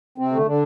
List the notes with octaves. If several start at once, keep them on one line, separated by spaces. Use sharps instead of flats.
C3 C4
D3 A3
D3 D4